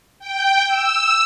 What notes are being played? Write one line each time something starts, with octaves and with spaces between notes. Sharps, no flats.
G5
E6